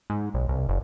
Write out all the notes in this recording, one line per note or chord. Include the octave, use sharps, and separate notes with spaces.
G#2
B1
C2
F#1